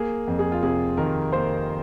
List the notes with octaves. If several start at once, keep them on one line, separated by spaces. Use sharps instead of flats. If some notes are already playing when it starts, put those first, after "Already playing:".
Already playing: A#3 G#4
F2
G#4
F4
C3 G#4
D#3 A#4
A#3 C5